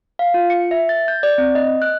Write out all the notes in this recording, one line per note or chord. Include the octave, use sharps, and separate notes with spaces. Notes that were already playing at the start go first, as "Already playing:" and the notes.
F5
F4
C#7
E5
A6
G6
D5
C4
D#5
F#6